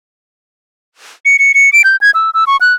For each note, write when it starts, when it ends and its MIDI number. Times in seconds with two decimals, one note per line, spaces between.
1.25 1.37 97
1.39 1.52 97
1.54 1.70 97
1.73 1.82 98
1.84 1.96 91
2.01 2.11 92
2.14 2.30 88
2.34 2.44 88
2.47 2.57 85
2.61 2.74 90